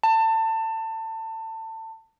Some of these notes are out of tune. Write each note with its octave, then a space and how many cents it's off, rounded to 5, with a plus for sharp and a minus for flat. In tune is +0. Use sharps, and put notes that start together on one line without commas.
A5 +25